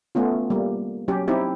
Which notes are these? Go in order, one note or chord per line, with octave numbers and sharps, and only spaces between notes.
A3 B3 C#4 F4
G3 A#3
F#3 C#4 G4
C4 D#4 E4 G4